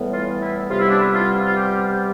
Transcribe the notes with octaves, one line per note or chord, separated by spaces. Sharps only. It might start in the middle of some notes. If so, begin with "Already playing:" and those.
Already playing: A2 E3 G3 B3
F4
E4
C3 G3 B3 F4
E4
D4
E4
F4
F4
G4